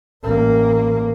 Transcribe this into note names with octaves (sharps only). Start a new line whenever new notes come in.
A1 A#3